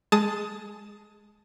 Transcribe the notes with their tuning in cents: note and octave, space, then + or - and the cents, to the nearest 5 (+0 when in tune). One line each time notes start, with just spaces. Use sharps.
G#3 +0 A5 +0 D#6 +20